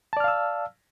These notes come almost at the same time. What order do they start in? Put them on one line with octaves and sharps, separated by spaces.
A5 D5 F6 F5 E6